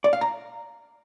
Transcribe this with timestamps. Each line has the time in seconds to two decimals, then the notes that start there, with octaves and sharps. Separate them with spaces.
0.04 D5
0.13 F5
0.21 A#5